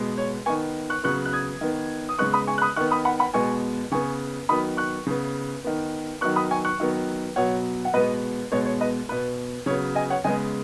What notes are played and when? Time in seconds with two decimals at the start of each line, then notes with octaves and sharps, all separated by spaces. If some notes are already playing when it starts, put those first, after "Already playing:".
Already playing: B2 G#3 B3
0.18 C#5
0.46 D#3 B3 G#5 C#6
0.90 C#6 F#6
1.04 C#3 F#3 B3 C#6 F#6
1.25 F#6
1.33 D#6 G#6
1.61 D#3 B3
2.09 D#6
2.19 C#3 G#3 B3 C#6 F#6
2.33 B5 D#6
2.47 G#5 C#6
2.58 F#6
2.62 B5 D#6
2.76 D#3 B3 C#6 F#6
2.91 B5 D#6
3.05 F#5 B5
3.19 F#5 B5
3.34 B2 G#3 B3 G#5 C#6
3.91 C#3 B3 G#5 C#6
4.49 D#3 F#3 B3 B5 D#6
4.77 C#6 F#6
5.06 C#3 B3
5.64 D#3 B3
6.21 D#3 F#3 B3 C#6 F#6
6.36 B5 D#6
6.51 G#5 C#6
6.65 C#6 F#6
6.80 D#3 F#3 B3
7.36 B2 F#3 B3 C#5 F#5
7.85 F#5
7.94 B2 G#3 B3 B4 D#5
8.52 B2 G#3 B3 C#5
8.65 C#5
8.81 B4 D#5
9.09 B2 B3 B4
9.66 C#3 F#3 B3 C#5
9.95 D#5 G#5
10.10 C#5 F#5
10.24 C#3 G#3 B3 D#5 G#5